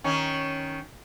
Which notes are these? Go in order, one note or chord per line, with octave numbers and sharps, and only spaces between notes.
D#3 C#4